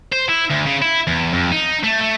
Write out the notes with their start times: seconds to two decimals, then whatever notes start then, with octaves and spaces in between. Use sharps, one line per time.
0.12 C5
0.29 E4
0.50 D2
0.66 C#3
0.82 E4
1.07 E2
1.33 F2
1.52 D#4
1.84 A3
2.01 A3